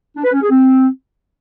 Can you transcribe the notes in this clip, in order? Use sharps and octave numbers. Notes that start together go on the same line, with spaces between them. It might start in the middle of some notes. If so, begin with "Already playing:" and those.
D4
B4
C#4
G#4
C4